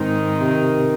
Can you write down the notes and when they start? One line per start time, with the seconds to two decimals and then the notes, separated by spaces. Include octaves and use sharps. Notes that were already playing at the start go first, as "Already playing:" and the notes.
Already playing: G#2 D#3 C4 D#4
0.41 C3